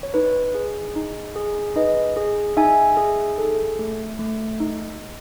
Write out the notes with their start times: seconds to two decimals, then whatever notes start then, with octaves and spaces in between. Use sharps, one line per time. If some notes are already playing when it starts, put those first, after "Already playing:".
0.03 C#5
0.14 D#4 B4
0.55 G#4
0.95 D#4
1.36 G#4
1.76 D#4 B4 D#5
2.17 G#4
2.57 D#4 E5 G#5
2.97 G#4
3.38 A4
3.79 A3
4.19 A3
4.60 D#4